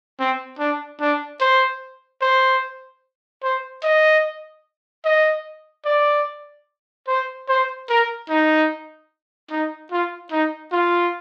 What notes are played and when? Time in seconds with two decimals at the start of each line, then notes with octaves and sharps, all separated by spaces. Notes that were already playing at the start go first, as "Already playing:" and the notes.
0.19 C4
0.59 D4
1.00 D4
1.40 C5
2.21 C5
3.43 C5
3.83 D#5
5.05 D#5
5.85 D5
7.07 C5
7.48 C5
7.89 A#4
8.29 D#4
9.51 D#4
9.91 F4
10.31 D#4
10.71 F4